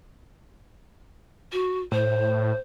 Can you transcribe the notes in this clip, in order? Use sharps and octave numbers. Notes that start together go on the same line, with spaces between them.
F#4
A2 C5